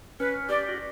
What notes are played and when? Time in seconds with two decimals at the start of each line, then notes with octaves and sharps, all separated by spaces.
0.20 C#4 B4
0.49 G4 D5
0.69 F#4